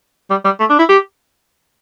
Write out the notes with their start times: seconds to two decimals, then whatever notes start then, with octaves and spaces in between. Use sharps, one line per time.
0.30 G3
0.44 G3
0.60 A3
0.70 D4
0.79 E4
0.89 G4